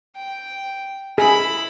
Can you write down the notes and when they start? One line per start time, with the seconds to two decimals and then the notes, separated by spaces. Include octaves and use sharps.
0.16 G5
1.18 E4 G#4 B5